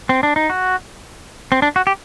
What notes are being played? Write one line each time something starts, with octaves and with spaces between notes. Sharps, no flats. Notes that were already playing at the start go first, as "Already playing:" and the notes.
C4
D4
D#4
F#4
C4
D4
F#4
G4